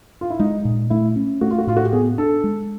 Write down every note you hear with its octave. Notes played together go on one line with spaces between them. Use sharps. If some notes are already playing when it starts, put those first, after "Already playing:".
F4
E4
G#3 D#4
A#2
A3 E4
C#4
A3 F#4
F4
F#4
A2 F4
F#4
G4
B3 G#4
D4 A4
G#3